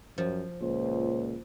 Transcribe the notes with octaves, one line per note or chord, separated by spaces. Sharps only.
F#2 F3
C#2 A#2 C5